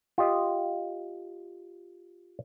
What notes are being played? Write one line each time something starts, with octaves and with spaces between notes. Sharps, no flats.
F4 G4 D#5